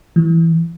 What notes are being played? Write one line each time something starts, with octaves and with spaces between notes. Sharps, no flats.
E3